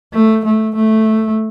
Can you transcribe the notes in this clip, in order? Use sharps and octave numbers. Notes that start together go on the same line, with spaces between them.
A3
A3
A3